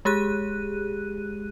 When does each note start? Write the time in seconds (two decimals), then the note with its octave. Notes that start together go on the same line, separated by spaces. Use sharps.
0.05 G#3 G4 G#4 F#6 D#7